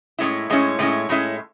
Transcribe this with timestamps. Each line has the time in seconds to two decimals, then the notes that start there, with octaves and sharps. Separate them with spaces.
0.19 A2 G#3 C#4 E4
0.50 A2 G#3 C#4 E4
0.79 A2 G#3 C#4 E4
1.09 A2 G#3 C#4 E4